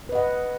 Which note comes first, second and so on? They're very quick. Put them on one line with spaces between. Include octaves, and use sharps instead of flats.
B4 D#5 F#5